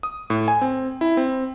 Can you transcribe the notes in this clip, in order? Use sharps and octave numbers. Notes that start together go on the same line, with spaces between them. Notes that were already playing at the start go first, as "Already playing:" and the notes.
D#6
A2
G#5
C4
E4
C4